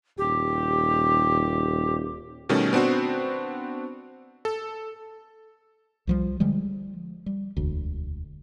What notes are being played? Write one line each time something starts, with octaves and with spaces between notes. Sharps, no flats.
D#1 G4
B2 D#3 G3 A3 C#4
B3 C4 D4 F#4 C5
A4
C2 F3 G3
D3 F3 G3 G#3
G3
E1 D2